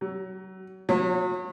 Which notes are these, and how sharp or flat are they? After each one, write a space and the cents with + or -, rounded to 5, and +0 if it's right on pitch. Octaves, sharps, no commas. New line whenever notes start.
F#3 +30
F#3 -35